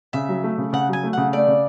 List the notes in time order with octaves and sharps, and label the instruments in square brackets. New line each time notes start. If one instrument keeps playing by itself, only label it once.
[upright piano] C#3 [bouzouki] E5
[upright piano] F#3
A3
C#3
[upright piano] C#3 [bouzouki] F#5
[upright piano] F#3 [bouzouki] G#5
[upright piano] A3
[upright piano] C#3 [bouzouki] F#5
[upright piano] A3 [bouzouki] D5
[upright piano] C#3